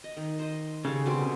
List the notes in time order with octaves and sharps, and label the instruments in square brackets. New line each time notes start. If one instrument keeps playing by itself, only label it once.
[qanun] D#5
D#3
C5 D#5
[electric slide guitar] C#3 [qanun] G3 A4
[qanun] B2 D3 C4